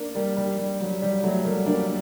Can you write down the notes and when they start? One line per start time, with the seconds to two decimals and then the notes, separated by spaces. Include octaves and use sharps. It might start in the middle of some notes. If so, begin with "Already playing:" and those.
Already playing: A#3 D4
0.15 G3 A#3
0.37 G3
0.58 G3
0.81 F#3
1.02 G3
1.23 F#3 A3
1.45 G3 A#3
1.66 A#3 D4